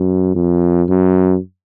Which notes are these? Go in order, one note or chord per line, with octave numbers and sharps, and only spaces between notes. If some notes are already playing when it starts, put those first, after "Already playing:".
Already playing: F#2
F2
F#2